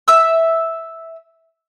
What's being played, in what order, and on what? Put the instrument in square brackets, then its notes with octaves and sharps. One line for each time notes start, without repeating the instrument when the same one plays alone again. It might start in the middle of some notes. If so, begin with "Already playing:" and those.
[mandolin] E5 E6